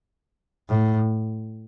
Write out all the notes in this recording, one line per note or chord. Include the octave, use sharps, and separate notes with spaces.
A2